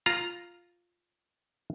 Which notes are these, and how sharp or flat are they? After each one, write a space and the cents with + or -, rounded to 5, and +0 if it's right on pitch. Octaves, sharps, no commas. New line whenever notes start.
F4 +0 A#5 +0